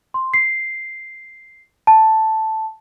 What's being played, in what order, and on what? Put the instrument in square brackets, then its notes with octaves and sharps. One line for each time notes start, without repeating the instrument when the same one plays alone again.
[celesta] C6
C7
A5